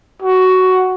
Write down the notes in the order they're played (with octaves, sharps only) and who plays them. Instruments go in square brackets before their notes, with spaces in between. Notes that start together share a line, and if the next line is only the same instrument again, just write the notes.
[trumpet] F#4